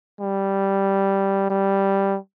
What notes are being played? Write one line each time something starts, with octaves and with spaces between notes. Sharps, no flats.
G3
G3